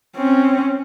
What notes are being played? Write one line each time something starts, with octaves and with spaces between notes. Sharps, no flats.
C4 C#4